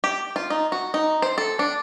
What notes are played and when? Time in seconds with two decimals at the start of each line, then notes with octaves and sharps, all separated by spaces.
0.04 G4
0.36 F4
0.50 D#4
0.72 F#4
0.94 D#4
1.22 C5
1.38 A4
1.59 D4